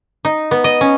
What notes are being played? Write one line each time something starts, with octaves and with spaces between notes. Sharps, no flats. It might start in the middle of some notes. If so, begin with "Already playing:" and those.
D#4
B3
D#5
C#4